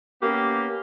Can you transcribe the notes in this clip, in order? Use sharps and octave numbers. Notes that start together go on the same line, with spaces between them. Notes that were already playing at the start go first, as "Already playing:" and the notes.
A#3 B3 C#4 G4